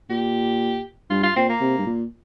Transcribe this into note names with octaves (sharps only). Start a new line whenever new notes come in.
A#2 G4
G2 F4
F4
A#2 C4
A#3
C3
G2
A#2